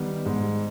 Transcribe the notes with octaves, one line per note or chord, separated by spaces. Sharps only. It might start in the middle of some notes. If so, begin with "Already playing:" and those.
Already playing: D#3 G3 B3
G#2